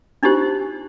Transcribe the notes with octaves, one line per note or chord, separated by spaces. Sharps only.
D4 D#4 F4 G4 C5